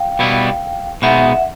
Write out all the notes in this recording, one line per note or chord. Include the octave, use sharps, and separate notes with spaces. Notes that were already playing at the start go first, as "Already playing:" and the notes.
Already playing: F5 G5
B2 G3 B3 E4
B2 G#3 B3 D#4 E5 F#5